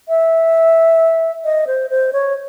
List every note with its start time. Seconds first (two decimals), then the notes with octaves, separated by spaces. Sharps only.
0.08 E5
1.44 D#5
1.67 C5
1.90 C5
2.13 C#5